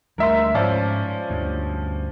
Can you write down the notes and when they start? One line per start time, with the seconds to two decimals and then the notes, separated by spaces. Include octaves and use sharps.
0.18 D2 G3 A3 A#4 E5 C6
0.54 G#2 F3 C#4 D5
1.30 D2 G2